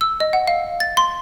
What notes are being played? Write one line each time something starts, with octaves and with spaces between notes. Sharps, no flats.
E6
D#5
F#5
F5
A6
C6